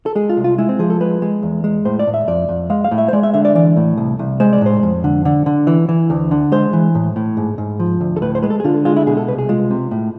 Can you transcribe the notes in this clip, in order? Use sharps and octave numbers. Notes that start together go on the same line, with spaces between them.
A4
G#3 G#4
F4
C2
F4
G#3 E4
C4
F3 G#4
A4
G#3 B4
G#3
E2
G#3
A2 C5
D5
A2
E5
F2 D5
F2
G#3 F5
F5
A2
E5
C5
G#3 D5
E5
D3 E5
D5
E3 D5
A2
C2
C2
G#3 C5
D5
A2 C5
F2
D3
D3
D3
E3
E3
D2
D3
G#3 C5
E3
A2
A2
G#2
G#2
F3
D2
A4
A2 B4
C5
G#3 B4
A4
G#4
D3 F4
A4
G#3 F4
E4
B2 G#4
A4
C2 B4
G#4
G#3 F4
C3
A2